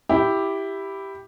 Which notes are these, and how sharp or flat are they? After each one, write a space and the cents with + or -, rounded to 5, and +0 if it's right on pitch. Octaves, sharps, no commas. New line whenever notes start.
E4 +0 G4 +0